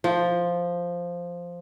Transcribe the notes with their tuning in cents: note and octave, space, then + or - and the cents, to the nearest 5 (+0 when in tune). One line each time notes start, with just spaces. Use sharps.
F3 +0